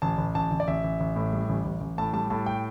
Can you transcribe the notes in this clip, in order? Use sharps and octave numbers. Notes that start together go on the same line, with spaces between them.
A1 A5
A1
A1 A5
A1
D5
A1 E5
A1
A1
A2
G3
A1
A1
A1
A2 A5
G3 A5
A2 A5
G5